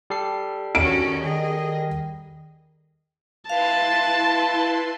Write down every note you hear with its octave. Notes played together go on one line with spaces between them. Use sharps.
G3 A4 C7
D#3 C#4 F#4 D7
D#3 G#4 D#5
E4 B4 F5 A5 C6